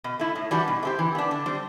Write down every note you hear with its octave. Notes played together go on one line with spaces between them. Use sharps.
B2
A3 E4
A2
E3 G3 D4 F#4
B2
A3 C4 G4
E3
B3 D4
D3
G3 C4